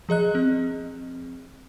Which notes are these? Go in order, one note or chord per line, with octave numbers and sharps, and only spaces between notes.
F3 G#4 D#5 F#6
C4